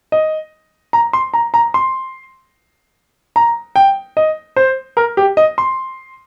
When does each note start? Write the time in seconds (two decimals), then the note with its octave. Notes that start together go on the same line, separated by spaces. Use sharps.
0.12 D#5
0.93 A#5
1.13 C6
1.34 A#5
1.54 A#5
1.74 C6
3.36 A#5
3.76 G5
4.17 D#5
4.56 C5
4.97 A#4
5.17 G4
5.37 D#5
5.58 C6